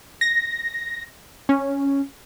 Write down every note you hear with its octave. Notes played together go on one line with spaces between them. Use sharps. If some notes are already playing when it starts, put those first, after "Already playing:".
A#6
C#4